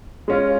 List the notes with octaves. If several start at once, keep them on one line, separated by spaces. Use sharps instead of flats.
G#3 C#4 F4